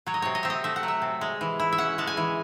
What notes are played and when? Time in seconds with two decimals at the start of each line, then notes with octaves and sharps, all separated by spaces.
0.06 F#3 C#5
0.14 D#5
0.22 C3 C#5
0.35 D#5
0.43 C4 E5
0.50 D#5
0.64 A3 E5
0.76 F#5
0.83 F#3
0.88 E5
1.02 C3
1.21 G#3
1.41 E3
1.59 E4
1.72 E5
1.78 C#4 F#5
1.98 G#3 A5
2.07 G#5
2.17 E3